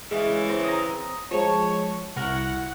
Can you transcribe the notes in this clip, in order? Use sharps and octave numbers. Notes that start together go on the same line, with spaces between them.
C#3 E3 G#3 E5 F5
C4 A#4
A#5 D#6
F3 G#3 C#5 A5
C2 E4 F#4 A#4 F#5 F6